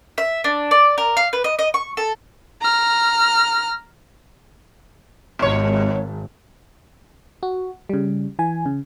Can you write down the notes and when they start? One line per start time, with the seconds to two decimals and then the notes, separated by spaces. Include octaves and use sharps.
0.18 E5
0.44 D4
0.71 D5
0.98 A#4
1.17 F5
1.33 B4
1.44 D#5
1.59 D#5
1.74 C#6
1.97 A4
2.61 A#5 F6
5.39 G#1 B2 C#5
7.43 F#4
7.89 C#3 G3
8.39 E3 G#5
8.66 C#3